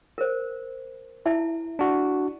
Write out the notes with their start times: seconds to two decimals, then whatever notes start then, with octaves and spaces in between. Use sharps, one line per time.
0.18 A#4 C5
1.25 E4 E5 A5
1.79 D4 F#4